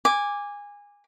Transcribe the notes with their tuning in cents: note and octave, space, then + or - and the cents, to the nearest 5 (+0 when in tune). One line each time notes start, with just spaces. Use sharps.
G#5 -20 D6 +0